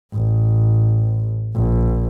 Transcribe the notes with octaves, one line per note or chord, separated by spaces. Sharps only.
A1
A#1